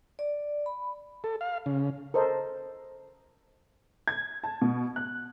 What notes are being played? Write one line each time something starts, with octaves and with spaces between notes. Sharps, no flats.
D5
B5
A4
F5
C#3
A4 A#4 C5 D#5
G#6
A5
B2
F#6